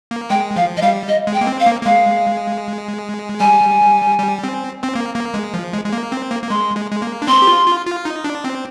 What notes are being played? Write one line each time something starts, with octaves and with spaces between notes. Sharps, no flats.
A#3
G#3 G5
F3 F5
D#5
G3 F5
D#5
G#3
G5
A#3
C4
F5
A#3
A#3
G#3 F5
G3 G#5
G3
C4
C4
A#3
A#3
G#3
F3
G#3
G#3
A#3
C4
A#3
A#3
G#3 C6
G#3
G#3
A#3
D4
C4 C6
G4
F4
F4
F4
D#4
D4
C4